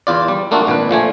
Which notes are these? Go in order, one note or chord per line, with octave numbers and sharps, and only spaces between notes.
E2 F4 D5
G3
A3 A#3 D4 F4 F#4 A4
G#1 A#2 D4 B4
A#2 F3 A3 G#5